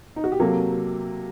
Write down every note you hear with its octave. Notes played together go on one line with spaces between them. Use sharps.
D#4
F#4
G4
C3 F#3 A#3 A4